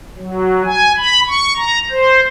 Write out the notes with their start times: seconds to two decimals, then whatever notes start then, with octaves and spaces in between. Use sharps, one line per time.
0.18 F#3
0.65 G#5
0.98 B5
1.27 C#6
1.56 A#5
1.90 C5